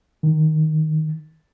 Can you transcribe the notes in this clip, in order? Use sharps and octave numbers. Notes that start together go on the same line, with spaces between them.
D#3